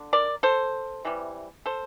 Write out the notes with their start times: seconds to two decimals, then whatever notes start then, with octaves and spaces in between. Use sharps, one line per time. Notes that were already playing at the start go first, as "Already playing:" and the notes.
Already playing: D3
0.13 A#4 D5
0.43 A4 C5
1.05 C3 E3 G3
1.66 A4 C5